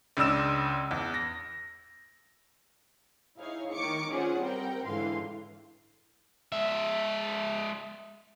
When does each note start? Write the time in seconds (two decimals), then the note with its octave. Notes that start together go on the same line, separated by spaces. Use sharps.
0.17 C#2 C#3 D4 E6 E7
0.91 E2
1.14 A#6
3.38 D#4 E4 G#4 C#5 F5
3.72 D#3 C#6 D6 C#7
4.11 C#4 F4 G#4 C5 D5 F#5
4.41 G3 C4 A#4 F#5 G5
4.86 C#2 G#2 D3 E3 F5 C6
6.52 G#3 E5